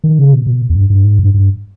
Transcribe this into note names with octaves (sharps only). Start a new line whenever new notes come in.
D#3
C#3
B2
B2
E2
G2
G2
G#2
G2
G2